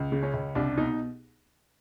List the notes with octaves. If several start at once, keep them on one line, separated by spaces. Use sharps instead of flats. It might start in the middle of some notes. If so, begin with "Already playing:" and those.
Already playing: C#2
C#3
C#4
C#2
C2 D4
B2 D#4